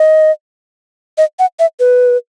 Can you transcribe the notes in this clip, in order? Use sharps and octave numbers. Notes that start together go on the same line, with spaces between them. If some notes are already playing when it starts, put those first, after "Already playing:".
Already playing: D#5
D#5
F#5
E5
B4